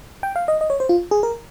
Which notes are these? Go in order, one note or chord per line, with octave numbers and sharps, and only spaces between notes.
G5
F5
D#5
D#5
C#5
C5
F4
G#4
A#4